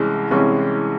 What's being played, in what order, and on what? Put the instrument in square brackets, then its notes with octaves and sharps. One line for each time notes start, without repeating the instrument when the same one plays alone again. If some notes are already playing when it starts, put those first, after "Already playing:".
Already playing: [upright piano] C2 C3 E3 G#3 C#4
C2 C3 E3 G#3 C#4